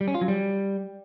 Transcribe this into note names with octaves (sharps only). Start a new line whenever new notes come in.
G3
C#4
F4
F#3
G3